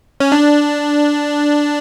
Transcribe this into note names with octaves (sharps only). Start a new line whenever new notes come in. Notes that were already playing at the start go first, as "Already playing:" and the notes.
C#4
D4